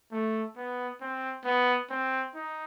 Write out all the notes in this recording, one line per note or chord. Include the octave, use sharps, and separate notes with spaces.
A3
B3
C4
B3
C4
D#4